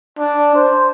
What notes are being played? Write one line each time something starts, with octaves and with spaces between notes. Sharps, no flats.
D4
C5